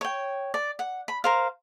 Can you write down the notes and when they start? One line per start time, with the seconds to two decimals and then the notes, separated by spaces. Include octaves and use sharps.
0.01 C#5 G5
0.54 D5
0.79 F#5
1.08 B5
1.24 A#4 C5 F5